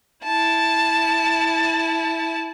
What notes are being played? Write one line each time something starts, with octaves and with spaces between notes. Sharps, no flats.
E4 A5